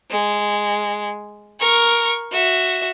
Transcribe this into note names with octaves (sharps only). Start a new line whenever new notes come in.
G#3
A#4 C#6
F#4 E5